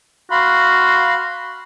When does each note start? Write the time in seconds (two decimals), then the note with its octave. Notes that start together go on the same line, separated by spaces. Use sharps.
0.31 F#4 F5 B5 C6